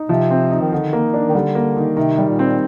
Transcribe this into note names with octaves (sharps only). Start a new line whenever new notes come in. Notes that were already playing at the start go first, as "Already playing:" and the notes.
Already playing: D#4
C3 F3
C4
D#4
D#3
D3 D#3
A#3
D4
D#3
D3 G3
A#3
D#3
C3 D#3
G3
A#2
C4